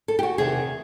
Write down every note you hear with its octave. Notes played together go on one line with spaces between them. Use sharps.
A4
G4
F#4
E2 C3 D#3 G#4